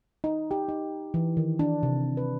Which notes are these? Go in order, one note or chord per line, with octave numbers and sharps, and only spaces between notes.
D#4
G4
D#4
E3
D#3
D4
C3
B4